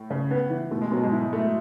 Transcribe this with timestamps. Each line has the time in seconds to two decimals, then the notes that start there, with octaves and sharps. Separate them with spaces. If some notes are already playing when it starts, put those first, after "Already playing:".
Already playing: A2
0.10 C#3
0.31 B3
0.50 E3
0.71 B2 A3
0.82 G#3
0.91 B2 F#3
1.03 G#2 G#3
1.11 E4
1.33 A3